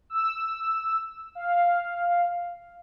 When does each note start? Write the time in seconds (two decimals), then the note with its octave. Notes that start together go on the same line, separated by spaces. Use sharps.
0.10 E6
1.35 F5